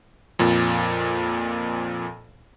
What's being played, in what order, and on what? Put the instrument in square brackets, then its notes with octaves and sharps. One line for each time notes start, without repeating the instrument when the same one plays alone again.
[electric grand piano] F2 A#2